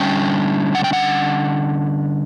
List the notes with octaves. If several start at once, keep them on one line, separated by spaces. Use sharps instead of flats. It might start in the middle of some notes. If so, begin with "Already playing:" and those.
Already playing: D3 G3 C#4 G5
F#5
G5
F#5